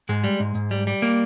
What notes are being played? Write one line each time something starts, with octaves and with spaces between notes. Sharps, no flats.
G#2 G#3
G3
G#2
G#2
G3
G3
A#3